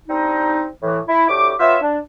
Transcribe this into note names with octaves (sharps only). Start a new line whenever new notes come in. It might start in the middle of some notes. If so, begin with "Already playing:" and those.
G3 C4 D4 D#4
A2 E3
E4
D2 A2 G4 D6
B3 F4 C#5 E5
D4